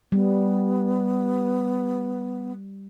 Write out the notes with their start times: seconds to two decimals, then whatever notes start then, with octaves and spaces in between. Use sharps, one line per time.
0.12 G3 B3